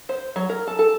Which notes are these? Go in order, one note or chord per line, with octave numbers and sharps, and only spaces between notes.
C5
F#3
A#4
A4
A4